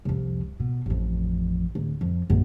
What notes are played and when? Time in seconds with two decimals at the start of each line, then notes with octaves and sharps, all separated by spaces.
0.05 C2 F2
0.60 B2
0.86 A1 F2
1.75 D1
2.01 F2
2.30 A#1 F#2